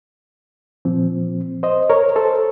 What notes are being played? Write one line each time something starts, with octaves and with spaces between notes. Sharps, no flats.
A#2 F3 C4
C5 D#5
A#4 C#5
A4 C5